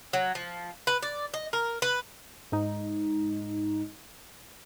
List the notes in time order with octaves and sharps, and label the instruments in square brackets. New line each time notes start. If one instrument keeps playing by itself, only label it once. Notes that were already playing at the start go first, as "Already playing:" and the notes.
[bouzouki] F#3
F3
B4
D5
D#5
A#4
B4
[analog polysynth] G#2 D#4